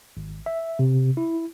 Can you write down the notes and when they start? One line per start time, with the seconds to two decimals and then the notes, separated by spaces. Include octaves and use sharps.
0.17 G#1
0.46 E5
0.79 C3
1.17 E4